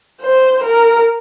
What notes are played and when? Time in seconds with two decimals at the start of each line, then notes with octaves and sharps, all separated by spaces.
0.21 C5
0.63 A#4